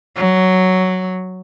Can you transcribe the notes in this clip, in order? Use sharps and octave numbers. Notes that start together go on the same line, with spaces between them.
F#3